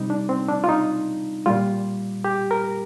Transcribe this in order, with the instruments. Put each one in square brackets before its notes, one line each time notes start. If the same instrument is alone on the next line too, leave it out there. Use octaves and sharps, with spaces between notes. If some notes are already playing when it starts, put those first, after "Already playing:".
Already playing: [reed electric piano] C3 G3 D#4
D4
C4
D4
F4
D#4
A#2 G3 F4
G4
A#4